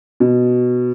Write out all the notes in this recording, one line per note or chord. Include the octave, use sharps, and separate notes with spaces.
B2